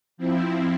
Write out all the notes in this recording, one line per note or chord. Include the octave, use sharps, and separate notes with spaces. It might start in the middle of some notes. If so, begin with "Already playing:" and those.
F3 C4 E4